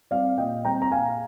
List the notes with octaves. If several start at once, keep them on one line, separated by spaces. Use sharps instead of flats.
G3 C4 D5 F5
A#2 D#5 G5
G3 C4 G5 A#5
A#5
A#2 F5 G#5